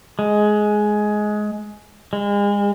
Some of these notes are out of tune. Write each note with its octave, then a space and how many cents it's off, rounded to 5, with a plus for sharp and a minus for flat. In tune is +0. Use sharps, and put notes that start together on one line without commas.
G#3 +15
G#3 -35